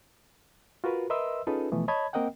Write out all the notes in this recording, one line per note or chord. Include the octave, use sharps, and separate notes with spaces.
F4 F#4 A#4 B4
A#4 B4 D#5 E5 C6 E6
C#4 D#4 F4 G#4 A4 B4
B2 E3 F3 A3 B3
C#5 D#5 A5 B5 G#6
A#3 C4 A#4 D#5 F#5 G5